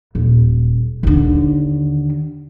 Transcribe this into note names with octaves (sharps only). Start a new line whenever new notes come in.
D#1
D#2 D3